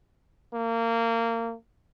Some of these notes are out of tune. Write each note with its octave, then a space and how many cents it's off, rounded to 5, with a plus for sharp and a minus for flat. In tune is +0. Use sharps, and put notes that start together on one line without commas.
A#3 -25